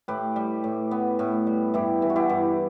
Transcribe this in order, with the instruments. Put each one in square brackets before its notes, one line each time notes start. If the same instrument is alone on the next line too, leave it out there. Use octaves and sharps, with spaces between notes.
[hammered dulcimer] A2 G4 B4
G3
A2
B3
A2
G3
G2 E4 G4
E3
F#4
E4 G4
G2